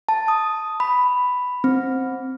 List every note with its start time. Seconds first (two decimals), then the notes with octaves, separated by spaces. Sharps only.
0.09 A5
0.28 D#6
0.80 B5
1.64 C4